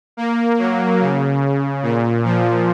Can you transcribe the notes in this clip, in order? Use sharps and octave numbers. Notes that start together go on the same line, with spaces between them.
A#3
F#3
C#3
A#2
F3